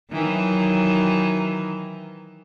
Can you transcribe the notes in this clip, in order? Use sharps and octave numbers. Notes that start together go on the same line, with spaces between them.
D#3 E3 F#3